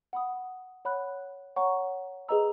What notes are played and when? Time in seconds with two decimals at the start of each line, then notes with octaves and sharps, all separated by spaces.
0.13 F#5 B5 D#6
0.85 C#5 F#5 B5 F#6
1.56 C#5 F#5 A#5 C#6
2.28 G#4 B4 D#5 A#5 E6